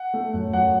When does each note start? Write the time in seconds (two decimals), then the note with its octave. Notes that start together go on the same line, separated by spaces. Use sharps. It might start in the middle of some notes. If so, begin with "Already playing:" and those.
Already playing: F#5
0.14 A3
0.34 F#2
0.53 F#2 F#5